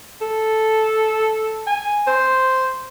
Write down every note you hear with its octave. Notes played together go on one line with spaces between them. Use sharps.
A4
G#5
C5